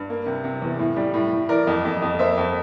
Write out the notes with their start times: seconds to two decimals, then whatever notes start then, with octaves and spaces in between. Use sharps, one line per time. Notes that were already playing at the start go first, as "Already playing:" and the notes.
Already playing: G2
0.10 A#3
0.26 C3
0.44 C3
0.62 E2
0.79 A2
0.97 G3
1.14 A2
1.33 A2
1.49 E3 A#4 D5
1.67 F2
1.85 F2
2.02 F2
2.19 A#3 C5 E5
2.38 F2